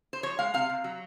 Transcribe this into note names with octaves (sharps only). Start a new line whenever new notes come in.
C5
F3 C#5
G#3 F5
C3 F5
C3
F#3